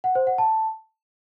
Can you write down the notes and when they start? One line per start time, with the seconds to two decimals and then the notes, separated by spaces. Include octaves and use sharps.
0.04 F#5
0.15 C5
0.27 F#5
0.38 A5